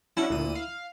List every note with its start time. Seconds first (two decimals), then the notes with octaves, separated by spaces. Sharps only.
0.17 C#4 D4 E4 F#4
0.30 D2 A#2 D#7
0.55 F5